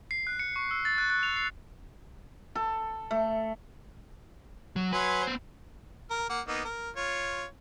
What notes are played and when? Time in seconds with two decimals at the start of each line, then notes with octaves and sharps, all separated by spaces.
0.11 C7
0.27 F#6
0.39 C#7
0.56 C#6
0.71 E6
0.85 A6
0.98 F#6
1.10 F#6
1.23 F7
1.36 C7
2.55 A4
3.11 A3
4.76 F#3
4.92 F#3 B4 G#5 C6
5.23 B3 C5
6.11 A#4 F6
6.29 A#3 F#5
6.48 A#3 B3 D#4
6.65 A#4
6.96 F4 C#5